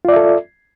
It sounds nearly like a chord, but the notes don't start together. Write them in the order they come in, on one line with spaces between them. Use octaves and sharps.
F4 D5 E5 A4